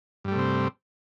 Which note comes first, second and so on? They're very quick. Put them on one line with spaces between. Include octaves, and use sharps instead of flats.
G2 G3 A3 C3 C4